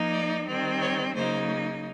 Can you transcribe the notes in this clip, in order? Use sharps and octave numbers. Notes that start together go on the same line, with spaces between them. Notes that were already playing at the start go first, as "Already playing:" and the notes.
Already playing: F3 A#3 D#4
D5
D#3 G3 C4
C#5
C#3 F#3 A#3 D#4 C5